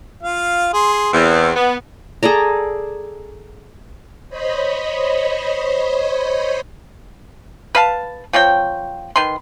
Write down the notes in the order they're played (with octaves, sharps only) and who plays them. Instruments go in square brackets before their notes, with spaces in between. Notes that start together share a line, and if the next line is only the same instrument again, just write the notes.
[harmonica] F4 F5
G#4 C6
[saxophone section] E2 [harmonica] C4
[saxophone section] B3
[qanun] G#4 A4 D5 A#5
[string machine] C5 C#5 D#5 B5
[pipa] B4 F5 A5
F3 C4 C#5 G5
D#3 B4 C6